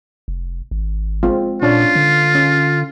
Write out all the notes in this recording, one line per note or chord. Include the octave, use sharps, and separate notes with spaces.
F1
G#1
G#3 C4 F4
A#2 C#4 D4 F4 C#5
D3
C#4